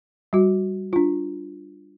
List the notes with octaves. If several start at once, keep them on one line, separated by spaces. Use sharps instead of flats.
G3 F#4
D4 F4